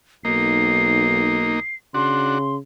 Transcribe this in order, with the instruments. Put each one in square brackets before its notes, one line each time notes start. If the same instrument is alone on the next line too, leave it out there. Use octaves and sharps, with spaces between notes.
[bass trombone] B1 [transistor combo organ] A#3 D#4 [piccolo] C7
[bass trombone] C#3 [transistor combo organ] D4 F#4 [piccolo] C6